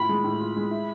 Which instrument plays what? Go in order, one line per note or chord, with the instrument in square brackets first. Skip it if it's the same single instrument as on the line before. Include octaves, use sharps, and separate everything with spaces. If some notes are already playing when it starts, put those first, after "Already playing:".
Already playing: [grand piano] A2 F4 [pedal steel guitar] B5
[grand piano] G#3
A2
F4
G#3
E4